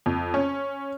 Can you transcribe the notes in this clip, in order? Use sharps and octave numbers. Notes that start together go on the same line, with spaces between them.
F2
C#4